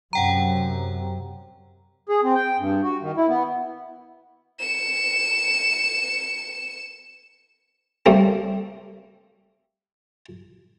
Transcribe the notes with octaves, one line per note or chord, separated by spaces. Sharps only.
F#2 C3 F#5 G5 A#5
G#4
C4
G5
G2
F#4
D#3
E4
B3
C#7 E7
G3 A3 A#3 C4